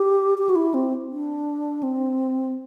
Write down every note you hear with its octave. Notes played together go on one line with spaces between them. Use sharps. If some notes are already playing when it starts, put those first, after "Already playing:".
Already playing: G4
G4
F#4
E4
C4
D4
C4